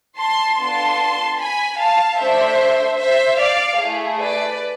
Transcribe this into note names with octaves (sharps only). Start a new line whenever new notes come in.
A5 C6
B3 D4 F4 A4 A5 C6
G#5 B5
F5 A5
A3 D4 A4 C5 E5
C5 E5
D5 F5
A3 E4 G#4
B4 D5